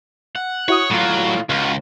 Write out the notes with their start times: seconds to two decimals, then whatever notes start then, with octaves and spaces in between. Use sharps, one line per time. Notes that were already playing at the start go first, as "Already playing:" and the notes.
0.35 F#5
0.68 E4 F#4 C#5 D#6
0.90 A2 F#3 F4
1.50 C#2 F4 F#4